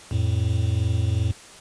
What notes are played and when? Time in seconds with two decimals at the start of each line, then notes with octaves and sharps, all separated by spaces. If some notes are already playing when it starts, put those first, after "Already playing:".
0.11 F2 A2